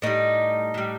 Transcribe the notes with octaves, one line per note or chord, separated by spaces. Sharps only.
A2 G3 D#4
A2 G3